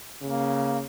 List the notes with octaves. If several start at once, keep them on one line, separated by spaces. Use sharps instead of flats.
C#3 A#3